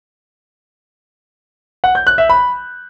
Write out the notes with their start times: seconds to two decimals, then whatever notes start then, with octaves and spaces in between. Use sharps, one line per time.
1.84 F#5
1.95 G6
2.07 F#6
2.18 E5
2.30 B5